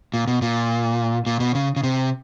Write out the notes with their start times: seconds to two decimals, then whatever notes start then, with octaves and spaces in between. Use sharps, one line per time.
0.14 A#2
0.27 B2
0.42 A#2
1.26 A#2
1.40 B2
1.55 C#3
1.76 C#3
1.83 C3